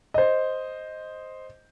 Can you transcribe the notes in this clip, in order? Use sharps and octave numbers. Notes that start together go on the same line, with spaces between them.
C5 D#5